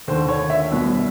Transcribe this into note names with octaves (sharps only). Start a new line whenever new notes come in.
D#2 D3 C5
C#5
E5
C2 B2